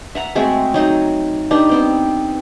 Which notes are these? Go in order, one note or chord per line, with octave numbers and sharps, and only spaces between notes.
E5 F#5 A#5
G#3 A3 C4 F#4
F#3 D#4 C5
D4 D#4 G4 B4
B3 C4 G5